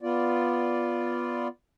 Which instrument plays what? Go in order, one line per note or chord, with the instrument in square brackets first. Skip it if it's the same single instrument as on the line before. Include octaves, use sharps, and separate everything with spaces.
[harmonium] B3 F4 D5